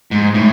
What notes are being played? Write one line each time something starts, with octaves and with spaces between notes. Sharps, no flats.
G#2
A2